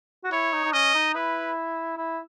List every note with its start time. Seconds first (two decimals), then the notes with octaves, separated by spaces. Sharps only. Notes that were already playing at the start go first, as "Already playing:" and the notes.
0.24 F#4
0.32 E4 C#5
0.53 D#4
0.64 D#4
0.73 C#4 D#5
0.94 D#4
1.15 E4 B4
1.97 E4